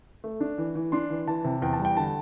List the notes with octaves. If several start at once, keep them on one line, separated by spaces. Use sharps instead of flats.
A3
D4
E3
E3
D4 C6
E3
E3 A5
C3
E2 G5
A5
G3
G5
D3 A5